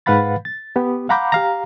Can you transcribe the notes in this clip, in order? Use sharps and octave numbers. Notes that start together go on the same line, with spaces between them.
G#2 B4 F5 F#5 B5 A6
A6
B3 G4
F5 F#5 A#5 B5 D6 G6
G4 F5 A#5